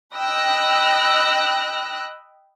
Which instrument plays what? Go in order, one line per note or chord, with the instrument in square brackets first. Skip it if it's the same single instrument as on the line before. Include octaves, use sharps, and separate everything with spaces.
[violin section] D#5 G5 B5 E6 F#6 A#6